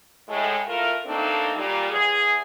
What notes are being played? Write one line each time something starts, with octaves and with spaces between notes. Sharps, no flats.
A2 G#3
A3 E4 F4 A4 A#4
A3 A#3 C4 D4 D#4 A4
A#2 G3
E2 G#4